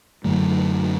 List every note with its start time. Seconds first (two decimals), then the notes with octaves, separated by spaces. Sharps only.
0.24 F#2 D3 F#3 A3